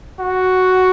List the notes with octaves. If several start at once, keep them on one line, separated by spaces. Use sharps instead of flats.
F#4